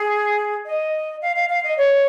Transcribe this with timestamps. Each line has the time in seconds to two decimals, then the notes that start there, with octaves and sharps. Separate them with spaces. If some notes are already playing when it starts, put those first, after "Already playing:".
Already playing: G#4
0.65 D#5
1.21 F5
1.35 F5
1.49 F5
1.63 D#5
1.77 C#5